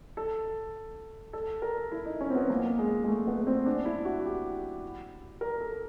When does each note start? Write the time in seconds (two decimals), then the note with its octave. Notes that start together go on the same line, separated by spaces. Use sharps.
0.17 A4
1.33 A4
1.62 A#4
1.92 E4
2.06 D#4
2.21 C#4
2.30 C4
2.35 B3
2.50 A#3
2.78 G#3
3.04 G#3
3.08 A3
3.27 B3
3.47 C4
3.66 D4
3.85 E4
4.05 F#4
4.25 G4
5.41 A#4
5.60 A4